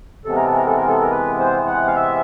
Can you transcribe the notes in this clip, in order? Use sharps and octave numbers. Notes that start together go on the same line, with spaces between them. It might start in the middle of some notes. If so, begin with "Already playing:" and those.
C3 E3 G#3 B3 A4
A#4
A4
A#4
A4
A#4
A4
A#4
B4
C5
F#5
F5
E5